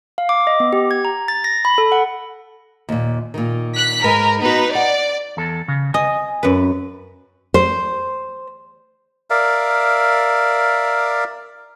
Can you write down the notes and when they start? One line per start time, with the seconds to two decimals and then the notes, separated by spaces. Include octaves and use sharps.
0.18 F5
0.29 D6
0.47 D#5
0.60 B3
0.73 G4
0.91 G#6
1.05 A#5
1.28 A6
1.44 A#6
1.65 B5
1.78 A4
1.92 F#5
2.89 D#2 A#2
3.34 A#2 D#3
3.75 F#6 B6
4.04 G#2 A#4 B4 G#5
4.42 B3 D#4 F#4 B4
4.75 D5 F#5
5.37 E2 A4
5.68 C#3
5.94 D#5 G#5
6.43 F#2 B4
7.54 C5
9.30 A#4 D5 E5 F5